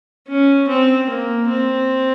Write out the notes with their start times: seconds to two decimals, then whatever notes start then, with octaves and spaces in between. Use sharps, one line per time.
0.28 C#4
0.68 C4
1.10 A#3
1.49 C4